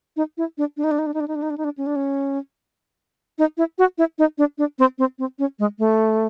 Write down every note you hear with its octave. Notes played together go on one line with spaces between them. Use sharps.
D#4
E4
D4
D4
D#4
D4
D#4
D4
D#4
D4
D#4
D4
D#4
D4
D#4
D4
C#4
D4
C#4
D#4
E4
F#4
E4
D#4
D4
D4
C4
C4
C4
C#4
G#3
A3